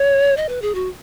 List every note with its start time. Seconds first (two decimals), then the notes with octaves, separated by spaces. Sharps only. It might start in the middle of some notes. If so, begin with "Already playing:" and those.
Already playing: C#5
0.37 D#5
0.49 B4
0.62 G#4
0.75 F#4